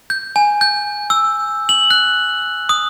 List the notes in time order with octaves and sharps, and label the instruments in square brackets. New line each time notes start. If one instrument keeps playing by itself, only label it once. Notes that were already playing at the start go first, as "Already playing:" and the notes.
[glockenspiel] G6
G#5
G6
E6
F#7
F#6
D#6